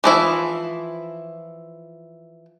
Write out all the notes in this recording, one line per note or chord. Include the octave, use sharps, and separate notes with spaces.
E3 F3 E4